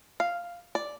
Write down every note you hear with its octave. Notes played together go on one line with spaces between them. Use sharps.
F5
D5